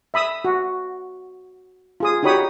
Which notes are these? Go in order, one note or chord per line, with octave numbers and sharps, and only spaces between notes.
E5 B5 D#6 E6
F#4
F4 G#4 D#6
D#4 F#4 G4 C#5 B5 D#6